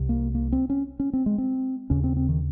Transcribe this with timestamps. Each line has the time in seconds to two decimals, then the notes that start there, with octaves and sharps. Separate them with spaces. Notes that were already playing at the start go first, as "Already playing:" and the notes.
Already playing: C2 C3
0.09 A#3
0.35 A#3
0.52 C4
0.70 C#4
1.00 C#4
1.13 C4
1.26 G#3
1.38 C4
1.90 D#2 C#3 C#4
2.04 C4
2.16 C4
2.29 D#3